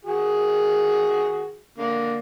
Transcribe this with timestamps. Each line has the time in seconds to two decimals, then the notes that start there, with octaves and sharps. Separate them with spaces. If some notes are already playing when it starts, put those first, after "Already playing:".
0.05 D#3 F#4 G#4
1.78 D3 A#3